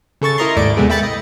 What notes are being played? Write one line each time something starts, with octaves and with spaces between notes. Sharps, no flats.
C#3 A4 C#6 A6
E4 A#4 D#5 A#5 C6 C#6
D#2 G#2 A3 E4 D5 D7
C3 G#3 A3 B3 G#4
E5 G5 B5 A6 C#7
D#5